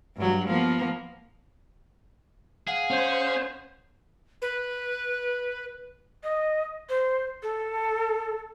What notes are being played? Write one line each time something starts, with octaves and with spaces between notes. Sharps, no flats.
G2 F#3
F3 A#3 B3
G#4 F5 F#5
C#4 C5
B4
D#5
C5
A4